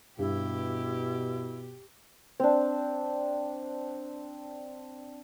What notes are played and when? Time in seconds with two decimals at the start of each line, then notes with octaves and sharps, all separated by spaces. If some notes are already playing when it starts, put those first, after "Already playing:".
0.19 G2 B2 E4 G4
2.40 C4 D4